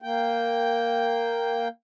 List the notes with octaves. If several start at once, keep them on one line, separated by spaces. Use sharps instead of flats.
A#3 G5